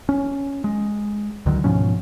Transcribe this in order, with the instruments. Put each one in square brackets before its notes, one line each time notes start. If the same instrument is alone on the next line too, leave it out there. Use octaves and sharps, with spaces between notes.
[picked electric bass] C#4
G#3
C#2 D3 D#3 F#3
G#2 B2 F3 C#4